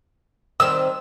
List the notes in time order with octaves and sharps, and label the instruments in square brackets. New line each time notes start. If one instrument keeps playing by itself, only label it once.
[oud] D#3 G3 C4 [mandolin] E6